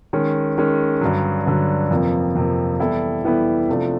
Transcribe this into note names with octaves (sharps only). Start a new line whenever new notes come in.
D#3 G#3 C#4
D#3 G#3 C#4
G2 D3 F#3
G2 D3 F#3
F2 C3 F3 A#3
F2 C3 F3 A#3
E3 G3 B3 E4 A4
E3 G3 B3 E4 A4
C3 F3 A3 D4